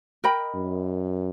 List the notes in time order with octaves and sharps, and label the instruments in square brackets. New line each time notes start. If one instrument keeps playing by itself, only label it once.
[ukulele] A#4 D#5 G5 B5
[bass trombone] F#2